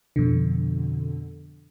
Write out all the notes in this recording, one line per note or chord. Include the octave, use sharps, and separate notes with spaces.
F2 B2 D3